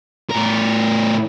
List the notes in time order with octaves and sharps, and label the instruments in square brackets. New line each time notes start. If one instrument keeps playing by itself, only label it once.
[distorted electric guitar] A2 A#4